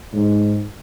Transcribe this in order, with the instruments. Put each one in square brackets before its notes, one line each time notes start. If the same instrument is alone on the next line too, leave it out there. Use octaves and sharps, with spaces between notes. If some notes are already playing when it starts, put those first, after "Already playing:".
[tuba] G#2